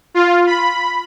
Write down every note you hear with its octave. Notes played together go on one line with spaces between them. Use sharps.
F4
B5